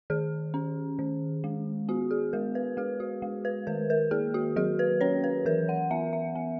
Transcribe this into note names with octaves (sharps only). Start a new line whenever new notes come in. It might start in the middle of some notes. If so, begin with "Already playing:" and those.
D#3 G#4
C#4
D#3
G#3
B3 F#4
G#4
G#3 A#4
B4
G#3 G#4
F#4
G#3
B4
D#3 A#4
A#4
A#3 G#4
F#4
F#3 G#4
B4
C#4 C#5
B4
E3 A#4
F#5
B3 E5
E5
B3